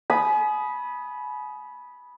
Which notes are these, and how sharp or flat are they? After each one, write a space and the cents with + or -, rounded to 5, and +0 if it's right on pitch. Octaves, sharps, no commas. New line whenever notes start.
G#5 +40 B5 -10 D#6 +0